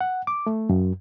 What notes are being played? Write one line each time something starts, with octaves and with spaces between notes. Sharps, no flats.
F#5
D6
A3
F#2